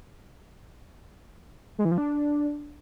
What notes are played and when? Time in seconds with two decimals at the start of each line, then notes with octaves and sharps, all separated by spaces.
1.79 G#3
1.85 E3
1.91 F3
1.98 D4